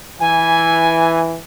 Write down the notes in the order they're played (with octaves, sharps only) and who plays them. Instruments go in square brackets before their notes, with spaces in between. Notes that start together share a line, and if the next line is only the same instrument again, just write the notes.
[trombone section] E3 [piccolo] G#5